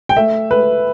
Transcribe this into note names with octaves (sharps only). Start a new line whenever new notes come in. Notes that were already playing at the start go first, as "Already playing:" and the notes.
G5
A3 E5
A3 B4